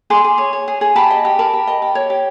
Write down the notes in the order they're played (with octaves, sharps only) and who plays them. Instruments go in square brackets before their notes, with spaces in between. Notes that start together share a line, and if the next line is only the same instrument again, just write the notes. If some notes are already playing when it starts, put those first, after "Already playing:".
[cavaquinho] G#4 C6 D6
G#4
C#5
C#5
G#4
G#4
G4 A5 B5
D#5
G4
A#4 A5 B5
G4
D#5
G4
C#5
G4